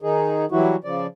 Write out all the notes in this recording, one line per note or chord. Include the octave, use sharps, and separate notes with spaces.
D#3 D#4 G#4
E3 F#3 G3 E4 F#4
C#3 F3 D5